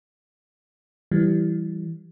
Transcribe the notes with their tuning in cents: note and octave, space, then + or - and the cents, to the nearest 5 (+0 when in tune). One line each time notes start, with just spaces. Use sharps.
E3 +5 G3 -15